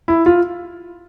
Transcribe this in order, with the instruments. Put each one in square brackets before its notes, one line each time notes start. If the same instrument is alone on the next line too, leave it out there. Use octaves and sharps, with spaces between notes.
[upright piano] E4
F4